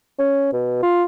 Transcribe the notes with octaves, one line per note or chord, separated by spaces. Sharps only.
C#4
B2
F4